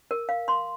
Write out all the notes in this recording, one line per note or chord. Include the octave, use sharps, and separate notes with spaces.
A#4
F5
C6